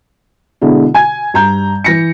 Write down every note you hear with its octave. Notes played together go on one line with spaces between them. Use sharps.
B2 D3 G#3 E4
G#5 G#6
G2 A#5 G6
E3 A#6 C#7